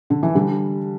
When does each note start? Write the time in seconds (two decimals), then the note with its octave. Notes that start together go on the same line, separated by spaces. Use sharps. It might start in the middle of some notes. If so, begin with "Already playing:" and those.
0.10 D3
0.23 E3
0.35 D3 G3